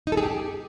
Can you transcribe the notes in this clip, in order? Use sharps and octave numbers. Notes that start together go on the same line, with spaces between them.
D#4
A4
G#4
G4